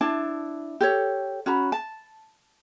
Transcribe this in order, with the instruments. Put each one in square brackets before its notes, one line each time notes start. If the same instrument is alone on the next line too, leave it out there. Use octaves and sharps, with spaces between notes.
[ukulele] D4 E4 A5
G4 A4 C#5
C#4 F#4 A#5 B5
A5